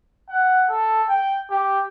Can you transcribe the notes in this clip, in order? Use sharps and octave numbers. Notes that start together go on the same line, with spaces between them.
F#5
A4
G5
G4